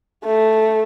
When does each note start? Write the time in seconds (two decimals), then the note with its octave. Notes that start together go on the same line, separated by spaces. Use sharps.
0.25 A3